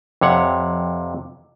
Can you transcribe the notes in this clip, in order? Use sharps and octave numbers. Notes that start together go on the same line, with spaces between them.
F2 C3 C#5 F#5